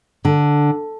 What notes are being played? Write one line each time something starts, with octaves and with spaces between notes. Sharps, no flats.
D3